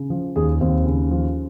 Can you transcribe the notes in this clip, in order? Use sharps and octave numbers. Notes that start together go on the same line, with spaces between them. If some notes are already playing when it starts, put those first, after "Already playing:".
Already playing: C#3
F3
D#2 G#4
D#2 C4
C#3
F3